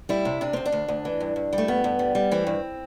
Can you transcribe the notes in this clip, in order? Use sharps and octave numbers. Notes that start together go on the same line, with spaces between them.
G3 E4
C3
C3 D4
D2 C4
D4
D2
D2
E3
G2
G2
G3
A3
G2 B3
G2
G3
G3
E3 C4
G2